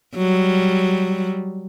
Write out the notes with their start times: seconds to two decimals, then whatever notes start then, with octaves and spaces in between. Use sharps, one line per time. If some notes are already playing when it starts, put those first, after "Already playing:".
0.16 F#3 G3